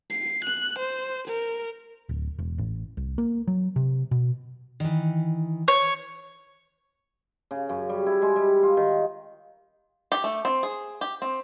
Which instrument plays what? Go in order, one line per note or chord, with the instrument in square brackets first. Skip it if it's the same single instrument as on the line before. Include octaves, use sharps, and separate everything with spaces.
[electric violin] C7
F#6
C5
A#4
[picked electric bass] D1
E1
A1
C2
A#3
F#3
C3
B2
[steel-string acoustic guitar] D#3 E3
[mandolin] C#5
[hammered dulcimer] C#3
F#2
G3
E4
G#3
G3
F4
D#3
[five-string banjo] G4
A3
C4
G#4
G4
C4